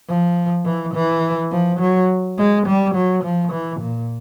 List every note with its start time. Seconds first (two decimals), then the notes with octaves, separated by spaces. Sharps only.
0.08 F3
0.65 E3
0.94 E3
1.51 F3
1.80 F#3
2.38 G#3
2.66 G3
2.95 F#3
3.24 F3
3.52 E3
3.81 A#2